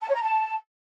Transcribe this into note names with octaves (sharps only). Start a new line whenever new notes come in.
A5
C#5
A#5
A5